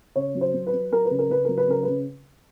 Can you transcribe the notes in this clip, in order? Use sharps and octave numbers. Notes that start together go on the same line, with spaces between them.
C#3 C#5
F#3
C5
F#3
B4
F#3
F#3 A#4
B4
C#3
A#4
C#3 B4
F#3 A#4
B4
C#3 A#4
C#3 B4